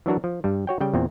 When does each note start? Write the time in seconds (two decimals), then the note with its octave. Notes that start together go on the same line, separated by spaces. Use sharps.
0.06 E3 F#3 D4 F#4 A#4
0.24 F3
0.44 G2 G3
0.67 F#4 C#5 G5
0.80 C#3 G3 G5
0.94 E2 A#2 C4